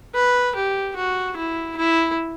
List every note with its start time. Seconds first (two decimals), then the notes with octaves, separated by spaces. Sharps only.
0.15 B4
0.55 G4
0.96 F#4
1.36 E4
1.76 E4